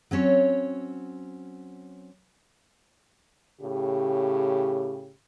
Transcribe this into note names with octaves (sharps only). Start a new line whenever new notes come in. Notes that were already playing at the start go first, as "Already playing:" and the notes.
F#3 C4 C#4 C#5
A2 C#3 G4